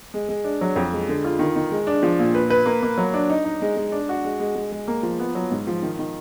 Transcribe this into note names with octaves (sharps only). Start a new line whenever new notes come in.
G#3
G#3
D4
F#3
F2
G#3
D3
F4
D#3
D#3
G#3
D4
F3
A#2
B4
B4
A#3
A#3
F#3
D4
D#4
D#4
G#3
G#3
D4
F#4
G#3
G#3
G#3
G#3
A#3
F3
B3
F#3
G#2
F3
D#3
D#3